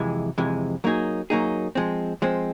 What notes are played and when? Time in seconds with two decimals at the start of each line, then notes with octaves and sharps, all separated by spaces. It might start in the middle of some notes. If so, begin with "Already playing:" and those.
Already playing: F2 C3 E3 G#3
0.38 F2 C3 E3 G#3
0.84 F#3 A#3 D#4 G#4
1.30 F#3 A#3 D#4 G#4
1.75 F3 G#3 C4
2.22 F3 G#3 C4